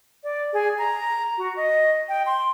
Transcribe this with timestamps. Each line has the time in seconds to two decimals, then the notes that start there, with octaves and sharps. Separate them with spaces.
0.24 D5
0.53 G#4
0.78 A#5
1.38 F#4
1.56 D#5
2.09 G5
2.26 C6